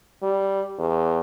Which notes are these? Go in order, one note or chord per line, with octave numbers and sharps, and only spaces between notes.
G3
E2